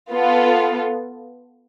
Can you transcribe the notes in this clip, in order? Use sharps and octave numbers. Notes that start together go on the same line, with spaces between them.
B3 F4 A4